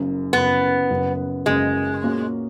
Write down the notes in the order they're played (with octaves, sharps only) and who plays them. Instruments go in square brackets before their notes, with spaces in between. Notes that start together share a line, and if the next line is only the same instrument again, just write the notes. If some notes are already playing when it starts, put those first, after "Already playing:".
Already playing: [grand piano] F#1 F#2 C#3
[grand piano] F#1 F#2 C#3 [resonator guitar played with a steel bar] B3
[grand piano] F#1 F#2 C#3
[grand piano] F#1 F#2 C#3 [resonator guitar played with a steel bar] G#3
[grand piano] A#2 A#3 C#4 F#4